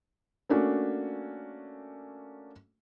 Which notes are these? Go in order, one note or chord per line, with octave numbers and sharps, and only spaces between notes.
A3 A#3 C#4 D4 F#4